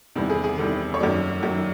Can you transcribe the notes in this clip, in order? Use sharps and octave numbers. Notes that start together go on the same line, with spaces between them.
E2 C3 D#3 G3
G#4
G#4
E2 C3 D#3 G3 A4
C#5
F#2 D#3 F#3 D5
F#2 D#3 F#3